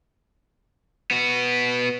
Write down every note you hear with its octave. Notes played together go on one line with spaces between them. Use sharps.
B3 F#4